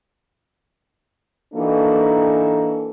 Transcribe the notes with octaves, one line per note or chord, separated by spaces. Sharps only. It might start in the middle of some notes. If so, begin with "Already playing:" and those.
E3 A#3 D4 D#4 F#4 A4